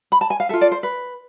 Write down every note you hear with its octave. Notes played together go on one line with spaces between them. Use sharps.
B5
A5
G#5
F5
F4 A4 E5
D5
C5
B4